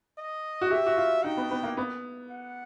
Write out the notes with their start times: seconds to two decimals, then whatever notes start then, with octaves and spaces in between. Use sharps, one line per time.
0.18 D#5
0.61 F#4
0.70 G4 E5
0.86 F#4
0.97 F4
1.23 D#4 G5
1.37 B3
1.51 B3
1.63 A#3
1.77 B3
2.30 F#5